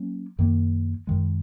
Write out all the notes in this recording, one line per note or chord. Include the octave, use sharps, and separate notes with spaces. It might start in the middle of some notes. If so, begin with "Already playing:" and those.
Already playing: F#3 A#3 C#4
F#2 D#3 A#3
F#2 D#3 G#3